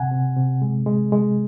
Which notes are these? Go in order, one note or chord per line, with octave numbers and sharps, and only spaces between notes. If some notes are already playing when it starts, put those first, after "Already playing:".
Already playing: C3 F#5 G#5
C3
C3
G#3
G#3
G#3